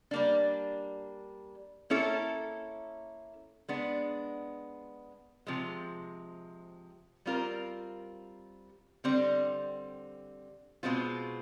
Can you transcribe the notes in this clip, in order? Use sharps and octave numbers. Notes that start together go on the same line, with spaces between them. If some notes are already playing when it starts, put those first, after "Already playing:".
G3 A#3 D4
A#3 C#4 E4 A4
G#3 B3 D4
C3 F3 G#3
G3 C4 F4 A#4
D3 G3 C4
B2 G#3 C4 F4